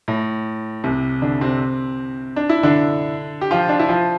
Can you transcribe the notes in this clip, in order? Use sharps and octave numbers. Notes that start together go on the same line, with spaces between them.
A2
C2 C3
D3 D4
C3 C4
D4
E4
D3 D4
G4
F3 F4
D4
E4
F3 F4